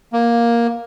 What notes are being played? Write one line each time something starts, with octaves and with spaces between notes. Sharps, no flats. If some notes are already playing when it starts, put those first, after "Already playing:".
A#3